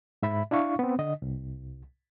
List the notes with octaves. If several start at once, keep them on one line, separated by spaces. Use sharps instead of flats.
G#2 E5 B5
D4 E4 F5 C#6
B3 C4
D3 D#5
C2